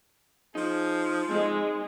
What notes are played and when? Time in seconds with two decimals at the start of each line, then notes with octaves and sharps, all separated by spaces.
0.55 F3 D#4 G#4
1.31 G#3 C4 D#4